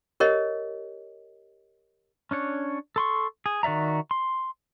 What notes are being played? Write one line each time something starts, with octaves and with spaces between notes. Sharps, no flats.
G4 A#4 C#5 D#5
C#4 D4 C#5
A4 C6 C#6
G#4
D#3 F#4 D5 E5 A#5
C6